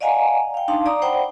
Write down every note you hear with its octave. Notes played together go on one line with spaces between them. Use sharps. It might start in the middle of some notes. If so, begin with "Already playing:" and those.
D5 D#5 F5 F#5 G#5 A#5
F5 G5
D4 D#4 F5 A5 C6
D5 A#5 D6 D#6
C5 D5 F#5 G5 B5